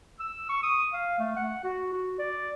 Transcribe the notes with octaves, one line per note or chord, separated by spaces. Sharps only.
E6
C#6
D#6
F5
A3
F#5
F#4
F#4
D5